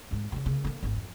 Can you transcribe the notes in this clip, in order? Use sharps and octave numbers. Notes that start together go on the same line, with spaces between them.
D#2 G#2
A#2 C#3
C#3 A#3
D3 A#3
G#1 B3
F2